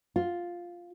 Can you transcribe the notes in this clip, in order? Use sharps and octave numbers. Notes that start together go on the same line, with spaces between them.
F4